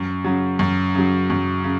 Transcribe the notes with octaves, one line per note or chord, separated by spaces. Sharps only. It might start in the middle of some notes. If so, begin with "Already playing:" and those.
Already playing: F#2
C#3 F#3
F#2
C#3 F#3
F#2
C#3